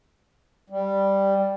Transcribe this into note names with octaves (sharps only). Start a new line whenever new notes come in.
G3